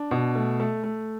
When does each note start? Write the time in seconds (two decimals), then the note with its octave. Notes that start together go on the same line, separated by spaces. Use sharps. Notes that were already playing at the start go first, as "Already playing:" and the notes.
Already playing: D4
0.11 B2
0.35 A3
0.60 A3
0.84 A3